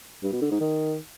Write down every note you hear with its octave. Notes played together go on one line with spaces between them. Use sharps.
G2
B2
D3
G#2
D#3